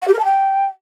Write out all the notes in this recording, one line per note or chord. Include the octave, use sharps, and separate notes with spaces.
F#5
G4
A#4
A5
G5